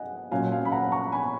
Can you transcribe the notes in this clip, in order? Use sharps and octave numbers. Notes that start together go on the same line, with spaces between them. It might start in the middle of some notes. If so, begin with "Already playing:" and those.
Already playing: D#5 F#5 G#5
A#2 F#3 C#4 F4 F5 G#5
F5 G#5
B5
F#5 A#5
A#5 C#6
G#5 B5